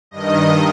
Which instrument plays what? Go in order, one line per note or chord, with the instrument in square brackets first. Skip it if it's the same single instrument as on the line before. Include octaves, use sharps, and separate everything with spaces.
[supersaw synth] G2 D#3 D#5